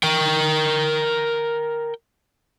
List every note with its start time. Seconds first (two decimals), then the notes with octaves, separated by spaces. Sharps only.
0.03 A#4 G5